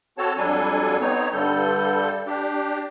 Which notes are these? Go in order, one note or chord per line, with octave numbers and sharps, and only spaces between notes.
C4 F#4 A4 C#5 A5
F2 F#3 G3 D4 A4 G#5
B3 C4 D#4 C#5
G2 D3 G3 A4 G6
D4 G4